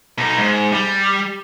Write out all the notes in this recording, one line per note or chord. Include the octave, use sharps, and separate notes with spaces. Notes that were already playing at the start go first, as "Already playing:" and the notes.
B2 D#4
G#2
G3